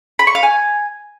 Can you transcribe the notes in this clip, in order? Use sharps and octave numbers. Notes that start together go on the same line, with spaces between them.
B5
C#6
F5
G#5